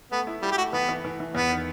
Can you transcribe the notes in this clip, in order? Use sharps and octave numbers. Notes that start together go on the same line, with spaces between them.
A3 B3
E4
G3 E4
G4
A3 F#4
E3 B3
E3
E3
E3
E2 B3
D#3